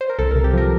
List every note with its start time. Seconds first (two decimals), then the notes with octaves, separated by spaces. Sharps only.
0.01 C5
0.10 A#4
0.19 C2 A4
0.31 C3 A#4
0.44 G4
0.54 F3 A#4